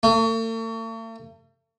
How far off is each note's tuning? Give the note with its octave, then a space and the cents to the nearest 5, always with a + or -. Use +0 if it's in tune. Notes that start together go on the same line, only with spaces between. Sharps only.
A3 +45